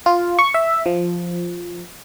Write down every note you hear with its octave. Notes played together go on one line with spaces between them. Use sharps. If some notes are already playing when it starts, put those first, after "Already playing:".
F4
C#6
E5
F3